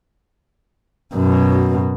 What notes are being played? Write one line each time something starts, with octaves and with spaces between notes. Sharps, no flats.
F#2 B2